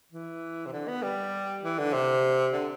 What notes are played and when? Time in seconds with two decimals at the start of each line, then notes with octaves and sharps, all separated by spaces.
0.12 E3
0.66 C3
0.72 D3
0.88 B3
1.02 G3
1.63 E3
1.78 D3
1.93 C3
2.53 D3